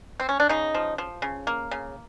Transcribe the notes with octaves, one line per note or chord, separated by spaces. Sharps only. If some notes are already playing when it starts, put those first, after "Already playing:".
C4
C#4
D4
C#3 D#4
F3
F3
C#3
A#3
C#3